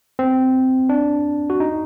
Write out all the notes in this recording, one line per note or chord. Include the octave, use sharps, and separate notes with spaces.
C4
D4
F#4
D#4